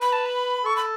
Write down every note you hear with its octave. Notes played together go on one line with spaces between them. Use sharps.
B4 B5
A5
B5
A4 C#6
B5